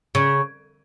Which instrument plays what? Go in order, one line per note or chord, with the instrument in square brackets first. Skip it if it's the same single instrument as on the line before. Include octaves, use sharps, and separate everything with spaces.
[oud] C#3